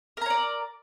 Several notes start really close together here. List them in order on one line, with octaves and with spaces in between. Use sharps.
A#4 A#5 C#5 D5